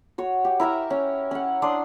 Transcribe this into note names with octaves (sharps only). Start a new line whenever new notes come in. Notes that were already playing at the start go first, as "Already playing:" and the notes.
F#4 C#5
G4
E4 A#4 E5 A#5
C#4
C#4 F#5
D4 D5 C6 D#6